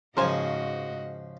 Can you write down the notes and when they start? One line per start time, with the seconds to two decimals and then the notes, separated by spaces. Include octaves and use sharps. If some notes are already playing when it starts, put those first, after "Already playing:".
0.17 G#2 C#3 F3 F#4 A#4 C5 D#5 G#5